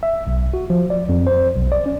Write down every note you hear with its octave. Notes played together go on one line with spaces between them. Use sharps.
E5
B1
F#4
F3
D5
F2
C5
B1
D5
C#4